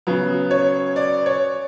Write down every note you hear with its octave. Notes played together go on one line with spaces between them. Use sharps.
C#3 F#3 B3
C#5
D5
C#5